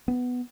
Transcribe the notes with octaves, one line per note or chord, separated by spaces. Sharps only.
B3